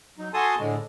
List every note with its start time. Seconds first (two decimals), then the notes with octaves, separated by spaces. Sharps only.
0.19 F#3 D#4
0.34 F#4 A4 G#5 A5 C6 D#6
0.59 A2 D3 G#3